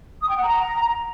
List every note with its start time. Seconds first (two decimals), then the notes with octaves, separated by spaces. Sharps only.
0.22 D#6
0.29 G5
0.36 F#5
0.44 A#5